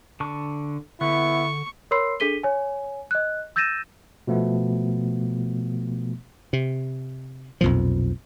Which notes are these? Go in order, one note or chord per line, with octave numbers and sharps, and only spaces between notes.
D3 A5 C#6
D3 B3 E4 C#6
A#4 C#5 B5 C6 E6 C7
D4 G#4 A4 B6 D#7 G7
C#5 G#5
D#5 F#6
E6 G6 A6 A#6 D#7 E7
B2 F3 A3 B3
C3
B1 F2 A#2 F3